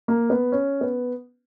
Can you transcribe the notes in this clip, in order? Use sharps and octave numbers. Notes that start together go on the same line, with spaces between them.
A#3
B3
C#4
B3